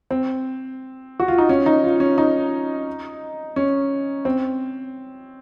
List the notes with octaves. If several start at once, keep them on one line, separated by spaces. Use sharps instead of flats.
C4
F#4
F4
D#4
C#4
D#4
F4
C#4
D#4
C#4
C4